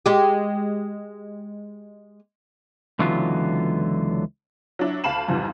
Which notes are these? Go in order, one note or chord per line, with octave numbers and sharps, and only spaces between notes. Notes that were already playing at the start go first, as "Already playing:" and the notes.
G#3 G4
C#2 D3 E3 F#3 B3 F4
F#3 D4 E4
D2 F5 A5 B5 E7 F#7
B1 F2 G#2 E3 F3 G3